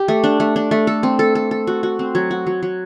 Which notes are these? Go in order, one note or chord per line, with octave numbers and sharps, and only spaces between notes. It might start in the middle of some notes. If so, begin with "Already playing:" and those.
Already playing: G4
A3
D4
A3
D4
A3
A4
C4
A4
A4
A4
F#4
F#4
C4
F#3
F#4
F#3
F#3